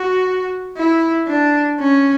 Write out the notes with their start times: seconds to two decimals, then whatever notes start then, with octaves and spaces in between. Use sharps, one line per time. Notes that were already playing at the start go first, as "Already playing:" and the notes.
Already playing: F#4
0.77 E4
1.27 D4
1.79 C#4